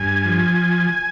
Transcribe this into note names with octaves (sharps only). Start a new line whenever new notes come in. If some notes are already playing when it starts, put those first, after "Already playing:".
Already playing: G2 G#5
F3